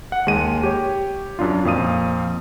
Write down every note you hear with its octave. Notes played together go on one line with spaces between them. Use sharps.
F#5
D#2 G#3 D#7
G4 C#5
F#2 D4 F4
F2 A#2 F5 D#6 D#7